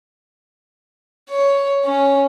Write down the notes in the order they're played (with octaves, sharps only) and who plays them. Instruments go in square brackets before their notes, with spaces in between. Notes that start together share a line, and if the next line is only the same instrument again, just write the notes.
[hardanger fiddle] C#5
C#4